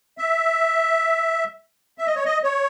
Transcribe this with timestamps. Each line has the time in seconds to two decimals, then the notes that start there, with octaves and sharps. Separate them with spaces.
0.18 E5
1.98 E5
2.06 D#5
2.15 C#5
2.25 D#5
2.43 C#5